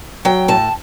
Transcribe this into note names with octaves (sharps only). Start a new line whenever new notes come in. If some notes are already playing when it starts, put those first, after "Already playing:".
F#3 G5
A2 A5